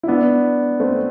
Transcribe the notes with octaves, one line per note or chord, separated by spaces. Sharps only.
E4
B3 D4
A3 C4